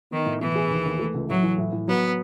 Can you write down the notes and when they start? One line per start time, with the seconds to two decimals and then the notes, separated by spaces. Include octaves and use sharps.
0.11 D#3 B3
0.26 A2
0.40 B2 E3
0.55 G#4
0.70 D#2
0.85 D#2
0.99 A3
1.14 C#2
1.29 A2 F#3
1.43 E3
1.58 A2
1.72 A2
1.87 F#3 B3